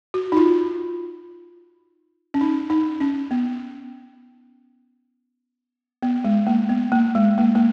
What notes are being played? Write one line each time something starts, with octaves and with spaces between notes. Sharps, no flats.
F#4
D#4
F4
C#4
D#4
D#4
C#4
B3
B3
G#3
A#3
B3
A#3
G#3
A#3
A#3